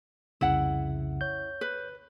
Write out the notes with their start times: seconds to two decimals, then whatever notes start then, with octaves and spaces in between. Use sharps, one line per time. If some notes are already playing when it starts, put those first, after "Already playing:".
0.41 C2 F2 C#3 E4 F#5
1.21 C#5 G6
1.61 B4